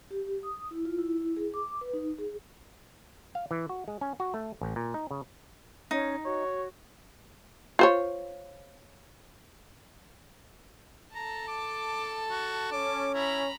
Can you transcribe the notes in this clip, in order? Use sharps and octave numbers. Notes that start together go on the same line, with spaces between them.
G4
D#6
E4
F4
E4
G#4
D6
B4
D#4
G#4
F5
E3
F#4
G#3
C#4
F#4
A3
A1
A#2
D#4
C#3
C#4 D#4
F#4 C#5
F4 C5 C#5
A4 A5 A#5
D6
F#4
C#4 D6
E4 A#5 B5